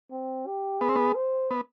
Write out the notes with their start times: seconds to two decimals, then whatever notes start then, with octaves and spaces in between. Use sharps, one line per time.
0.11 C4
0.47 G4
0.80 B3 G#4
0.89 C4
0.96 B3
1.15 C5
1.51 B3